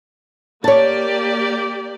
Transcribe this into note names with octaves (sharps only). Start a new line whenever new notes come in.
A#3 G4 C#5 D5 A5